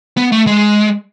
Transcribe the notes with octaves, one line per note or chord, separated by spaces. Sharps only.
B3
A3
G#3